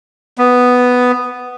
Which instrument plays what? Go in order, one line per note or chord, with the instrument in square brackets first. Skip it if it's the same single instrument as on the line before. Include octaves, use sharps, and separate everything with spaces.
[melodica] B3